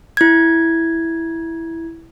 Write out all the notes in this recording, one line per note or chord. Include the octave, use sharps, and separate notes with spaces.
E4 G#6